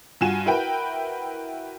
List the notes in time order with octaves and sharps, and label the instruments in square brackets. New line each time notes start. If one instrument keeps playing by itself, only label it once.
[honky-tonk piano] G2 F4 F#4 G#5 E7
E4 F#4 A#4 B4 G5